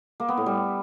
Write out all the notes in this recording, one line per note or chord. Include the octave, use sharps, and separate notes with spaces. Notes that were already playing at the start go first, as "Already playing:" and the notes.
A#3
B3
A2
G3